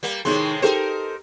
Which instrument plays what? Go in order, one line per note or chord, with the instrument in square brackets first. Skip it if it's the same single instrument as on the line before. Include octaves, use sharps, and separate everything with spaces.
[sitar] G3 A#3
[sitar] A2 C3 G#3 [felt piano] D#3 C6
[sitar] D#4 A#4 C5 [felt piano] G4 A4